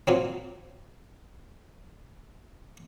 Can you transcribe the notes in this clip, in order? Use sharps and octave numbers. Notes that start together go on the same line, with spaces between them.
A#2 F#3 C4